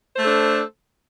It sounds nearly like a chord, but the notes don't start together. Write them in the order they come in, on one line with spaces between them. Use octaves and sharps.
C5 A3 A4 D4